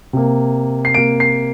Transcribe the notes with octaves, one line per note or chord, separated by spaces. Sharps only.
C3 A#3
C7
C3 A#3 D7
C7